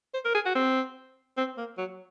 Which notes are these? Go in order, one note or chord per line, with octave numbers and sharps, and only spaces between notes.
C5
A#4
G#4
F#4
C4
C4
A#3
F#3